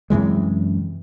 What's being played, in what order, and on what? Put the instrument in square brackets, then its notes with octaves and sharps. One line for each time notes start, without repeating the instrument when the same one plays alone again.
[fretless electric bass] F#2 C3 E3 G#3